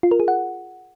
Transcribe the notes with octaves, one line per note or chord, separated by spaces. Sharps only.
F4
A#4
G#4
F#5